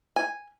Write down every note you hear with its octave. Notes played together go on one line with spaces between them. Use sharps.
G#5